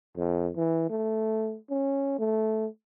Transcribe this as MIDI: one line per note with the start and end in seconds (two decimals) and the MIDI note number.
0.17 0.50 41
0.56 0.86 52
0.90 1.57 57
1.70 2.18 61
2.19 2.67 57